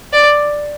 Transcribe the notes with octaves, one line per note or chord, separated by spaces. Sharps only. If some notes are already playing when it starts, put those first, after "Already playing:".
D5